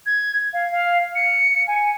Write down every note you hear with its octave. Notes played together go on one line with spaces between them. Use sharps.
G#6
F5
F5
C#7
G#5